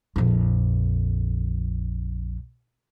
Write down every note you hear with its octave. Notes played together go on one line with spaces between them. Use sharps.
A#1 F2